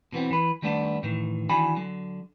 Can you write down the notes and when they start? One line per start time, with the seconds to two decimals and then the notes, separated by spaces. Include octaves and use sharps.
0.12 B2 E3 B3 C4
0.31 E3 B4
0.62 D#3 G3 A3 B3 C4 D4
1.03 A2 D#3 E3
1.49 D#3 E3 D4 F#4 G#5 B5
1.76 D3 F#3